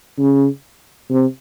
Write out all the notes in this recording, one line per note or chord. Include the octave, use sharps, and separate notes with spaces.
C#3
C3